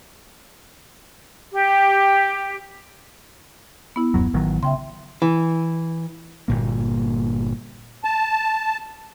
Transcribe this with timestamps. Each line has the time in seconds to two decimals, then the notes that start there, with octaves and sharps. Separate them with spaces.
1.52 G4
3.96 B3 E4
4.14 D#1 F#2 F#3
4.34 A1 D#3 F#3
4.63 C#3 E5 G5 C6
5.22 E3
6.48 G1 A#2 A#3
8.04 A5